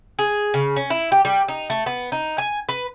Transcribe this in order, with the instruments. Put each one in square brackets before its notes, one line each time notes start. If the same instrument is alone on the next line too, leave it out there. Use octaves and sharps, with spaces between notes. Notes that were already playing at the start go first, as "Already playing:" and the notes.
[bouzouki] G#4
C#3
C#4
E4
G4
G3
D#4
A3
B3
D#4
G#5
B4